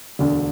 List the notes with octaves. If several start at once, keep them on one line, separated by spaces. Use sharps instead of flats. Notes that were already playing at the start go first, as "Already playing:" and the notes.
E1 D2 D3